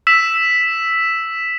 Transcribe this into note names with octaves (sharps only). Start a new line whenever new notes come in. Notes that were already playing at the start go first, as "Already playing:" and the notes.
E6 B6 E7